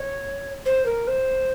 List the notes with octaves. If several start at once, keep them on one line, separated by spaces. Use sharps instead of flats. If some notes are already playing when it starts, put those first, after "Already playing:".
Already playing: C#5
C5
A#4
C5